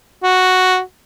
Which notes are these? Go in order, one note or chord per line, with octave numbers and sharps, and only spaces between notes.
F#4